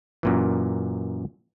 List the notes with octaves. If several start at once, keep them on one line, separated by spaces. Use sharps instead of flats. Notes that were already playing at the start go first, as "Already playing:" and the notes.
F#2 A#2 E3